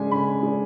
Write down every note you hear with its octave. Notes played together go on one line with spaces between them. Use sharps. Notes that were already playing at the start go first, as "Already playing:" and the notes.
Already playing: C#3 G#3 D4 G#5
C#3 B5
G#3 D4